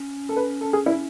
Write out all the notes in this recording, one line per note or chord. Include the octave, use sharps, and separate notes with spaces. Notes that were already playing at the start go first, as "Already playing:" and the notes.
Already playing: C#4
A4
B4
A4
G#4
E4